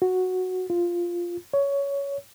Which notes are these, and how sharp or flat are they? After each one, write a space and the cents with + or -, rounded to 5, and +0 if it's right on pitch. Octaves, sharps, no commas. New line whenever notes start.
F#4 -5
F4 -5
C#5 +15